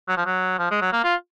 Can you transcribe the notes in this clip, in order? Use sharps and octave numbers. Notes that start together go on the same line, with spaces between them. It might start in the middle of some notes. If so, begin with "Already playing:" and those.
F#3
F3
F#3
F3
G#3
F#3
A#3
F4